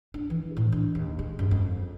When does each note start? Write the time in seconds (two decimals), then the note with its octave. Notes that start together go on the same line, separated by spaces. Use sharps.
0.14 D4
0.30 E3
0.57 A2
0.72 D4
0.95 D#2
1.19 G#3
1.39 F#2
1.51 F2